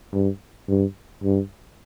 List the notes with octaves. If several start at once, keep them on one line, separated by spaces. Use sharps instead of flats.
G2
G2
G2